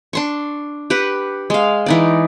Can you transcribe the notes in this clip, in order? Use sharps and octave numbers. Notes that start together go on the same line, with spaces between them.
D4 C6 C#6
G4 B4 F#5
G#3 F5
E3 D#4 D5